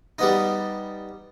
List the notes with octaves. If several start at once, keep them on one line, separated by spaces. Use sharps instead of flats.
G3 B3 D#4